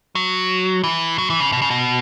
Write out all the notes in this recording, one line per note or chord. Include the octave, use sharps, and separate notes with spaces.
F#3
E3
F#3
E3
C#3
B2
C#3
B2